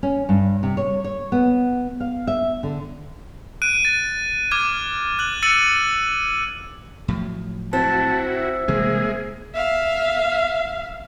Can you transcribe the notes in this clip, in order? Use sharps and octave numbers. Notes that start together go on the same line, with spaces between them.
C#4
G2
C3
C#5
C#5
B3
F5
E5
D3
F#6 D7 D#7
A6
D6 F6 G#6
F#6 F#7
E6 A6 C#7 D#7 F#7
A2 F3 F#3
C4 E4 F#4 A5
E5
C3 E3 G3 G#3 A#3 G#4
E5 F5